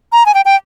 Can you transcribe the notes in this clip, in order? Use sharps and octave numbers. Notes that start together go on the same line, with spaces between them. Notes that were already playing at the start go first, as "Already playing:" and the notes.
A#5
G#5
G5
G5